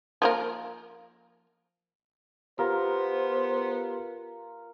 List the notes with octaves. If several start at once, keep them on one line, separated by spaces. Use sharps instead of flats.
F3 A#3 A#4
B3 F4 G4 A#4 C5 F5